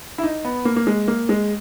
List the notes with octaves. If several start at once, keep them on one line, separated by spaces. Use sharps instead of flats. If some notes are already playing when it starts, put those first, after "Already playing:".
E4
D#4
B3
A#3
A#3
G#3
A#3
G#3